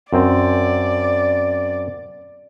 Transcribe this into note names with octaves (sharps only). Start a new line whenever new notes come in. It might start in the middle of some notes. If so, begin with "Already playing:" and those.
F#2 C4 D5